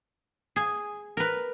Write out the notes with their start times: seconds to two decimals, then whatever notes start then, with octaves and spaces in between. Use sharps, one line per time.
0.56 G#4 G#5
1.17 A#4 B4